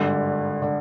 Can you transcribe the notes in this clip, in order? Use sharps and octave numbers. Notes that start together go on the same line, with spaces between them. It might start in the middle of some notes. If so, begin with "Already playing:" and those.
Already playing: G#1 G2 D3
D3